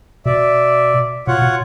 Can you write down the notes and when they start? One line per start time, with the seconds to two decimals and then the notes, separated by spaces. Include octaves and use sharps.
0.26 B2 D5 E5
1.27 B2 F4 C#5 F#5
1.42 B2